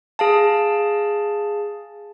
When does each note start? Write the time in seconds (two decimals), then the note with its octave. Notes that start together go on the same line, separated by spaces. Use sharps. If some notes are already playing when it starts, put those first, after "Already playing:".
0.19 G#4 F5 A5